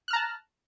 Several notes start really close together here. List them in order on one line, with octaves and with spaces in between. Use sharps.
F#6 F6 A#5 A5